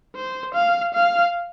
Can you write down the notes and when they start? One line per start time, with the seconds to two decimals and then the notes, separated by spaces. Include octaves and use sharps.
0.16 C5
0.54 F5
0.94 F5